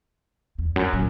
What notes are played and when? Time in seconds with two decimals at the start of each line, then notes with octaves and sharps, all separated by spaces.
0.58 E2
0.76 F#2
0.93 A#2